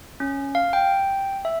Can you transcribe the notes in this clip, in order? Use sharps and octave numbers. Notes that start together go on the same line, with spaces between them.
C#4
F5
G5
E5